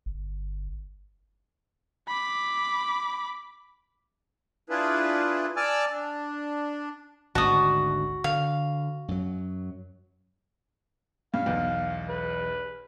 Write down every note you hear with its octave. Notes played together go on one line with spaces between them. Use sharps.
G1
B5 D6
D4 E4 F4 G#4 B4
D5 G#5 A5 D6 E6 F6
D4
G#1 D2 F#4 A5 D#6
D3 F5
F#2 F#3
G2 F5
B1 E2
B4